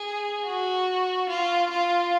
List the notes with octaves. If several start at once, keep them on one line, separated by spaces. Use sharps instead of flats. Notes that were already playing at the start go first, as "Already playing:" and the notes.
Already playing: G#4
F#4
F4
F4